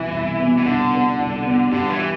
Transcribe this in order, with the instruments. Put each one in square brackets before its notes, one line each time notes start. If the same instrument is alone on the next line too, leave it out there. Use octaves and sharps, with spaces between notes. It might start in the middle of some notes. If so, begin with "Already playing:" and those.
Already playing: [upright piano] C2 B2 B3 [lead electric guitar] E3
[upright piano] C2
B2 B3
[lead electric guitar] E3
[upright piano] C2 [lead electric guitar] D3
[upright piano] B2 B3
C2
B2 B3
[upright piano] G2 [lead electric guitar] D3
[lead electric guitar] E3
[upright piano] D4 G4